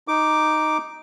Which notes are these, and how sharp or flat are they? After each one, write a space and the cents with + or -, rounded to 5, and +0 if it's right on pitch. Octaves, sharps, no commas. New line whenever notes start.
D#4 +0 D6 +0